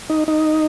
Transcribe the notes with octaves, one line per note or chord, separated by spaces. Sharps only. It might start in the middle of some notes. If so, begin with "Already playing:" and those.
D#4
D#4